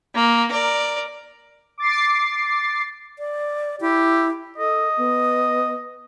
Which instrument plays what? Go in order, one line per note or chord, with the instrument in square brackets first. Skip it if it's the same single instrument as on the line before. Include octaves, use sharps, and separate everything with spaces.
[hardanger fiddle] A#3
A#4 D5
[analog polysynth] D6 A6 C7
[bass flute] D5
[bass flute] E4 [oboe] G4
[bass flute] A4 [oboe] D#5
[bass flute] B3